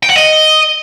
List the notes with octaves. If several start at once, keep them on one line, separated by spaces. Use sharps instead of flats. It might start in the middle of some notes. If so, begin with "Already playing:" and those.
G5
F#5
D#5